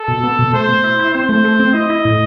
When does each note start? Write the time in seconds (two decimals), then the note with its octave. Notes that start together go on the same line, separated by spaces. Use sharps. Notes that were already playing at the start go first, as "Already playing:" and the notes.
Already playing: A4
0.08 B2
0.23 B3
0.39 B2
0.53 A3 C5
0.69 B2
0.84 E4
0.99 E4
1.14 C4 C5
1.29 A3
1.45 A3
1.60 C4
1.74 E4 D#5
1.90 E4
2.05 A2